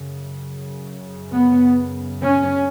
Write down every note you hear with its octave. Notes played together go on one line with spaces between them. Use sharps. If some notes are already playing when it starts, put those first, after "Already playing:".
Already playing: F#2 C#3
B3
C#4